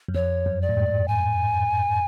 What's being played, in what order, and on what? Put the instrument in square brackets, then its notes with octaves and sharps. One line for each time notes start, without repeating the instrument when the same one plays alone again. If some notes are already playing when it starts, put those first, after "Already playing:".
[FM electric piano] F#2
[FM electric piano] F2 [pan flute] C#5
[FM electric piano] F#2
[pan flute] D5
[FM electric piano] A2
G#2
[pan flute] G#5